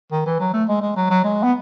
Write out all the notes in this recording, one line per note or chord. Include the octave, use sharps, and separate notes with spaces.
D#3
E3
F#3
A3
G#3
G#3
F#3
F#3
G#3
B3